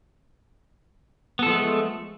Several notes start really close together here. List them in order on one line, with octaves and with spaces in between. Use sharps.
B3 A4 F3 G#3 A3